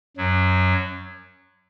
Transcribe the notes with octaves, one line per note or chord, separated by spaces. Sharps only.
F#2 F#3